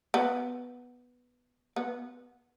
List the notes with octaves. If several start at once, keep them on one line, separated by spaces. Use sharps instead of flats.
B3
B3